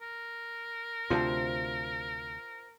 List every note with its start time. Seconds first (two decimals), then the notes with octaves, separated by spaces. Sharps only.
0.01 A#4
1.10 D2 C3 F4 C5 A5